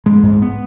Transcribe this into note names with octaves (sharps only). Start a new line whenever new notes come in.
G#2 G#3
G#2
B3